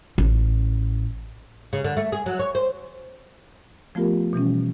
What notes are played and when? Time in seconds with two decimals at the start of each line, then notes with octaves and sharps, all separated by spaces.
0.18 A1
1.73 C#3
1.84 D3
1.97 A3
2.12 G#4
2.26 F#3
2.39 C#5
2.55 C5
3.95 F3 A3 B3 F4 G4 A#4
4.33 B2 E3 G3 C#4